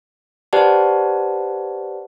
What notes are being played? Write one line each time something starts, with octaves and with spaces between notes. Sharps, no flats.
G4 B4 C5 D5 F#5 A5